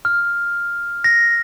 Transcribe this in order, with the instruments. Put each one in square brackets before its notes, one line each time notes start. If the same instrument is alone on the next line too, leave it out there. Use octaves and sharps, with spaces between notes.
[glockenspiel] F6
A#6